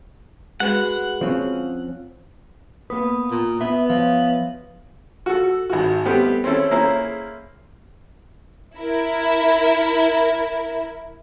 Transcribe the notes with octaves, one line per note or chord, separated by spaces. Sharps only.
G#3 F#4 B4 F#5
F3 C4 C#4
A#3 B3 B4 D#6
A#2
B3 B4 E5
F3 C#5 E5 F5
F#4 A4
G#1 F#4
G3 A3 B3 C4 G4
C4 C#4 E4 A4
A#3 C#4 E4 G#4 C5
E4 A#4